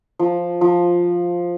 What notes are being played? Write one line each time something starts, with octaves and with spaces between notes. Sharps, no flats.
F3
F3